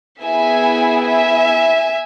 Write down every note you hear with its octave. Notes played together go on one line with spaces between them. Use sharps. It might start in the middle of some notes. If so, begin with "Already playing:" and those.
B3 E4 G#4 E5 G#5
E5 G#5